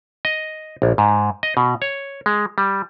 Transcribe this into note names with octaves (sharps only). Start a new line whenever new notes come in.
D#5
A#1
G#2
D#5
B2
C#5
G#3
G3